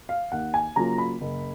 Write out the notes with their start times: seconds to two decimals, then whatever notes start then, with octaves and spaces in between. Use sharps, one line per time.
0.09 F5
0.32 D#2 F#5
0.54 G#5
0.76 C#3 F#3 A#3 F4 A#5
0.98 B5
1.21 F#1